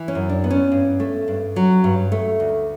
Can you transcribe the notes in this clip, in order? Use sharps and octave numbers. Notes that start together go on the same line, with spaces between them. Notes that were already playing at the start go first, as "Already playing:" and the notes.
Already playing: E3
C#4
F#2
D4
B3
C#4
G2
A3
G2
F#3
G2
A3
D2